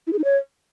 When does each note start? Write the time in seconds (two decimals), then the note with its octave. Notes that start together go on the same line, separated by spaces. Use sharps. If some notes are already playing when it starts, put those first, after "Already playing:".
0.07 E4
0.13 G#4
0.18 D#4
0.24 C#5